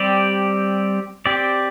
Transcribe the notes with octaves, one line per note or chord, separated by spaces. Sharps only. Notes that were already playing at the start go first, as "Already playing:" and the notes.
Already playing: G3 C4 G4 D5
C4 G4 D5